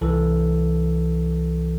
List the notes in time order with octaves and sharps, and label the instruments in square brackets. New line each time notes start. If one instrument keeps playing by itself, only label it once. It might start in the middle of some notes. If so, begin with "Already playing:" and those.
[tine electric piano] C2 E3 A4